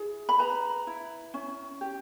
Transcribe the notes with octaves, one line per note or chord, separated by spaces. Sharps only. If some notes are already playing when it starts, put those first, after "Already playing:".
Already playing: E4 G#4
B5
B4 A#5
E4
C#4
G4